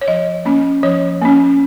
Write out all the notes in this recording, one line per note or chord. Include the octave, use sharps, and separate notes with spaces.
C#5
F3 D#5
A#3 C#4
F3 C#5
A#3 C#4